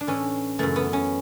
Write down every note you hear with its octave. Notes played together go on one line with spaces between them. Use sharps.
D4
A2 E3 C#4
F#2 C#3 E3 A3
B3
C#4